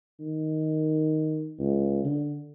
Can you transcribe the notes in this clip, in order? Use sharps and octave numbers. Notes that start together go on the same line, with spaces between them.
D#3
C#2
D3